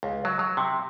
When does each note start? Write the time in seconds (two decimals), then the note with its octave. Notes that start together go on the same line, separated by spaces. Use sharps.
0.03 C#2
0.25 F#3
0.39 F#3
0.57 C3